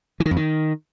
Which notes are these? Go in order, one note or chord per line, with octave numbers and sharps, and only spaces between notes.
E3
D#3
F2
D#3